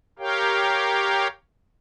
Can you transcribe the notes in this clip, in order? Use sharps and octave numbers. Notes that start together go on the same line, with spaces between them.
G4 A#4 C#5 F5 G5